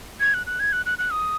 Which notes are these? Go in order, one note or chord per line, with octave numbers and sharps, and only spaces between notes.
G#6
F#6
F#6
G#6
F#6
F#6
F#6
D#6